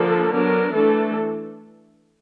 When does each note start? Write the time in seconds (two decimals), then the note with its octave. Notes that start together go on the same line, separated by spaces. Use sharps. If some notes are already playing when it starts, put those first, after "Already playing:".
Already playing: D3 F3 A#3 D4 A4
0.32 F#3 B3 D4 A#4
0.72 E3 A3 D4 A4